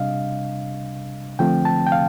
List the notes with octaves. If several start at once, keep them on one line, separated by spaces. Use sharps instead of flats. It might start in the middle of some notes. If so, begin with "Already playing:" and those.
Already playing: C3 G3 D4 D#5 F5
D3 F3 A3 C4 G5
A5
G5
F5